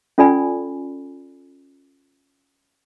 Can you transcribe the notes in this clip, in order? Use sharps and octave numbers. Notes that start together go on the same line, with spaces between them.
C#4 F4 A4 D5 G#5 B5